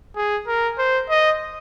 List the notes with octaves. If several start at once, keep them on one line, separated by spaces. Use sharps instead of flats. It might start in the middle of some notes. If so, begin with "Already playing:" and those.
G#4
A#4
C5
D#5